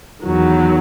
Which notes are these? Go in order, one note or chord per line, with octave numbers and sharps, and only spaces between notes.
E2 D#3 F#3